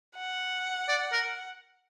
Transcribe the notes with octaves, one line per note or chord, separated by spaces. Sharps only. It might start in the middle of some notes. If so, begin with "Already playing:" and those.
F#5
D5
A#4